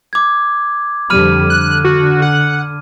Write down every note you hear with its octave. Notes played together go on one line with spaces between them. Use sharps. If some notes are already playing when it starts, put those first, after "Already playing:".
D6 G#6
F2 D3 G3 B5 F6 D#7
D3 F#6
F#4
F#5